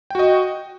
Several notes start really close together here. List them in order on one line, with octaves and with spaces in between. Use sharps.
G5 F#4 D#5